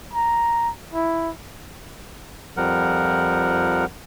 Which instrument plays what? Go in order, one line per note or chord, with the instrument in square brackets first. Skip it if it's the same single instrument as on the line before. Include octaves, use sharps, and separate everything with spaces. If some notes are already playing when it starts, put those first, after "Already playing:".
[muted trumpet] A#5
E4
[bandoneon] F2 F3 G3 A#4 F#5